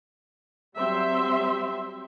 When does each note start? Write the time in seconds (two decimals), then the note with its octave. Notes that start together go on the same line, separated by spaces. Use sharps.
0.76 F#3 G3 C4 E5 C6